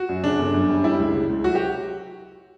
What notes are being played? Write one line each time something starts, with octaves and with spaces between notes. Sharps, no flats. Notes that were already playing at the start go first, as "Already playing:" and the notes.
Already playing: F#4
F#2
C#3 D4
G1
F#2
G3
G3 E4
C#2
C#3
C#2
F#3 F#4
G4